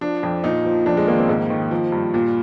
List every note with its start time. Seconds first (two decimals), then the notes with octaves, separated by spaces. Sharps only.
0.01 F3 D4
0.23 F2
0.44 A#2 D#4
0.65 F3
0.86 F2 D4
0.97 G#3
1.07 D#3 A#3
1.18 C4
1.29 G#2 A#3
1.50 D#3
1.71 F3
1.92 G2
2.14 A#2